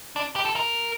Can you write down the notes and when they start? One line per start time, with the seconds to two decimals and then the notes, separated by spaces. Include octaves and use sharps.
0.16 D4
0.36 G4
0.45 A4
0.56 A#4